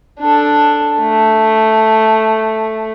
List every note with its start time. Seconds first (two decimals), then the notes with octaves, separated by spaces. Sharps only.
0.20 D4 A4
1.00 A3